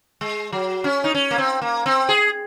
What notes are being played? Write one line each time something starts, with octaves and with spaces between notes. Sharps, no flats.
G#3
F#3
C#4
D#4
C#4
A#3
C4
A#3
C4
G#4